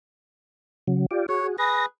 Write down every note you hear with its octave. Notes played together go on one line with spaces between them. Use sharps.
C#3 F#3
F4 G4 D5
F#4 G#4 C#5
G#4 B4 A#6